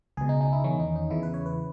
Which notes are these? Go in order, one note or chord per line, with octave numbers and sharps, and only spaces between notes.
C#2 B2 G#4
D#4
D#4
E4
E2 D#3 C#4
D#4
D#4
E2 C#3 E3 E4
B4
C#5
B4